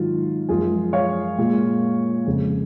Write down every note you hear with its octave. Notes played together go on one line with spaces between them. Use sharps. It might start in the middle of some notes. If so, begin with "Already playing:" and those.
Already playing: G#2 D#3 F#3 F4
F#2 F3 G#3 F4 G#4
C#5 F5
A#2 G#3
F2 C#3 G#3